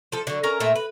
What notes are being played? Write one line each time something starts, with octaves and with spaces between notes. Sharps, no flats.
F3 A4
D3 F#3
C#4 A#4 A#5
A#2 A3 A#4 E5
B4